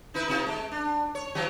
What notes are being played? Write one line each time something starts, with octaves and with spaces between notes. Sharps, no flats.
D#4 E4 B4
C3 D#4 F4
G#3
D4
C#5
E3 F#3 G4